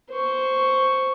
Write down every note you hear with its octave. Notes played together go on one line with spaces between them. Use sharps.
C5 C#6